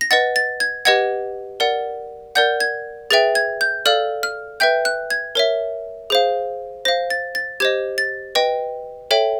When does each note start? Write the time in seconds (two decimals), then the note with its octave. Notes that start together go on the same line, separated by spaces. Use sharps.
0.01 A#6
0.11 B4 D#5 F#5 A6
0.36 A6
0.60 G#6
0.85 G4 B4 D#5 F#5 G#6
1.60 A#4 D5 F#5
2.35 A#4 D5 F#5 G6
2.60 G#6
3.10 G#4 B4 E5 G5 A6
3.35 G#6
3.61 G6
3.86 A4 D5 F5 F6
4.23 F6
4.60 B4 E5 G5 G6
4.85 F#6
5.10 G#6
5.35 A#4 C#5 E5
6.10 G#4 C5 F5
6.85 C5 F5 A#6
7.10 A6
7.35 A6
7.60 G4 C5 D#5 G#6
7.98 A6
8.35 B4 D#5 G5
9.11 A4 C#5 E5 G5